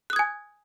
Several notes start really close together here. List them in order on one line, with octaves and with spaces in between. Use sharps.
F#6 D#6 G#6 G#5